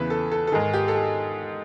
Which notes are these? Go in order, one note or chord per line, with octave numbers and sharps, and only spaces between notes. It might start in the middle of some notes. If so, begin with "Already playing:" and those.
Already playing: E2 C#3 E3 B4
A4
A4
A4
G#2 D#3 G#4
G4
A4
G#4